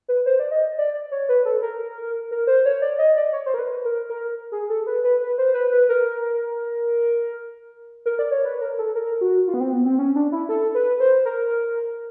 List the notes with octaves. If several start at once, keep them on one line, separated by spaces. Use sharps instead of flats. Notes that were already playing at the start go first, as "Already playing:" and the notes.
B4
C5
D5
D#5
D5
D5
C#5
B4
A4
A#4
A#4
C5
C#5
D5
D#5
D5
C#5
C5
A#4
B4
A#4
A#4
G#4
A4
B4
B4
B4
C5
B4
B4
A#4
A#4
D5
C#5
B4
A#4
A4
A#4
F#4
F4
B3
C4
B3
C4
C#4
D4
E4
A4
B4
C5
A#4